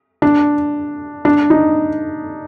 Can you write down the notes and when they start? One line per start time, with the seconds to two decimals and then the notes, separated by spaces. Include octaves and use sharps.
0.22 D4
1.25 D4
1.50 D#4